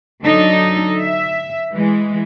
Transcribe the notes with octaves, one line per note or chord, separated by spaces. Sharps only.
D3 F#3 D#4 A4
E5
E3 G#3